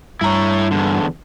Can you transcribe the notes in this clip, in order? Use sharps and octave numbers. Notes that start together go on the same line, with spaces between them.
G2 E4 C#5 A#5
E2 G#2 D3